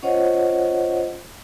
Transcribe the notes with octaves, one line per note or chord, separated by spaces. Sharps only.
C#4 F4 C5 C#5 D#5 F#5